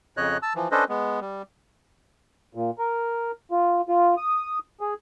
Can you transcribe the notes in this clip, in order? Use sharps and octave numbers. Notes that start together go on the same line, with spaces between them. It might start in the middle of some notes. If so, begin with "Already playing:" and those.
F2 C#3 C#5 D#5 F#6
A5 E6
E3 F3
C#4 D4 A4 B4 C5 D#5
G#3 B3
G3
A#2
A#4
F4
F4
D#6
G#4